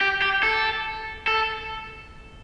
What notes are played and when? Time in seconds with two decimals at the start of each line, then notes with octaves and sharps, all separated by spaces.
0.01 G4
0.22 G4
0.43 A4
1.28 A4